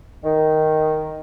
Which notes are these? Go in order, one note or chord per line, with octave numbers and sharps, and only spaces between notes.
D#3